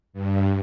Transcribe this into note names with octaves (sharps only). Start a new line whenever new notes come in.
G2